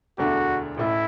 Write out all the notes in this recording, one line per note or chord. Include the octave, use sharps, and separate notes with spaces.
E1 D2 D3 A3 D4 F#4
A1 A2 A3 E4